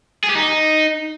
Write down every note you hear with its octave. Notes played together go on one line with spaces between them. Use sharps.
G#4
G4
D#4